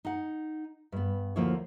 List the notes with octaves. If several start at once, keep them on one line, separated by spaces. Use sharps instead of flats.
D#4 F#5
G2 B3
D2 F3 A#3 E4 C#5